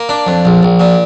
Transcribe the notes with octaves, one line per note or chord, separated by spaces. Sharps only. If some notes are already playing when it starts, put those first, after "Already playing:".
Already playing: A#3
D4
F2
A#1
A#1
A#2